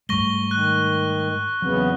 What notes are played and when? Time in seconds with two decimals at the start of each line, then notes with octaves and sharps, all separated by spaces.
0.09 G#2 G3 A3 C#6 A#6 G7
0.51 D#3 F#6
1.62 E2 C#3 F#3 B3 C4